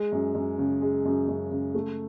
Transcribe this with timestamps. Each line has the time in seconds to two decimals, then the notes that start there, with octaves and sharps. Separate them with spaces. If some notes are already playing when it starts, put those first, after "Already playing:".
Already playing: G#3
0.12 F#2
0.35 F#2
0.58 C#3
0.81 G#3
1.05 F#2
1.28 F#2
1.51 C#3
1.74 A3